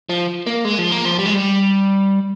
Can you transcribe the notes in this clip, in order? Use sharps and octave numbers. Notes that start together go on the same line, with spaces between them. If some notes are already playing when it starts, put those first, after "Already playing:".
F3
A#3
G#3
F3
A#3
F3
G3
G#3
G3